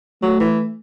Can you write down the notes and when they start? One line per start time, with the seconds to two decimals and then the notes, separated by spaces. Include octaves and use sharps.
0.22 F#3 A3
0.40 E3